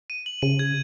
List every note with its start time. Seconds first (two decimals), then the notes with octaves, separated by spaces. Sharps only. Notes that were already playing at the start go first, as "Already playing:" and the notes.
0.10 D#7
0.26 F#7
0.42 C#3 D#7
0.59 G#6